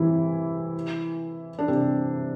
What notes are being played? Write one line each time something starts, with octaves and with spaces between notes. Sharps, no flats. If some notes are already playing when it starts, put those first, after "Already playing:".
Already playing: C3 E3 E4
D4
C3 C4